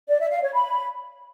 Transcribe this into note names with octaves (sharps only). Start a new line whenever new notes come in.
D5
E5
F5
C#5
B5